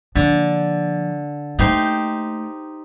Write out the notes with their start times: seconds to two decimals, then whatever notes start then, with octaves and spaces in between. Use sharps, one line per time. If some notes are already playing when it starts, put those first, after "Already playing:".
0.15 D3 F3 A#3
1.59 A3 A#3 D#4 G4 C5